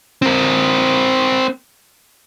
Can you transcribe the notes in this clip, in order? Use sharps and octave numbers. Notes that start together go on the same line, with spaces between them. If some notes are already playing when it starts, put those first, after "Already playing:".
C4 A#4